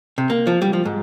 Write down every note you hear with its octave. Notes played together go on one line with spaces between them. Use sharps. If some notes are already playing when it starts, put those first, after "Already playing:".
C3
A#3
F3
G3
F3
G#2